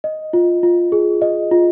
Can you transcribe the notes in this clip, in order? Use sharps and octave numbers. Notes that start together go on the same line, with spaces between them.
D#5
F4
F4
G#4
D#5
F4